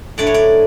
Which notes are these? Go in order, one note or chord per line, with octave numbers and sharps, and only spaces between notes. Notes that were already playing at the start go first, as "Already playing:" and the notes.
A2 F#3 A3 D4 D5
C#5
D5